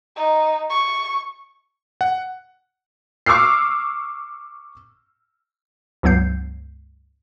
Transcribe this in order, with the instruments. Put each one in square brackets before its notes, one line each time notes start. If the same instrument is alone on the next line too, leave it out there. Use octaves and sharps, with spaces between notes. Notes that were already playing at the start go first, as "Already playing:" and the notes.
[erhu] D#4
C#6
[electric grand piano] F#5
[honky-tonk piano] C#6 D6 E6 F6 C7
[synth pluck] C#2 G2 F#3 B3 G6 C7